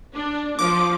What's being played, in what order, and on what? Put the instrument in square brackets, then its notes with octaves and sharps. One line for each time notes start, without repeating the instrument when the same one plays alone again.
[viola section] D4
[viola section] F3 [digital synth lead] D6